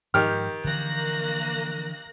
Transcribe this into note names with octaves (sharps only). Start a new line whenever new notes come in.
G#2 D#3 F3 G4 F6
D3 E3 F3 A#3 F#6 A#6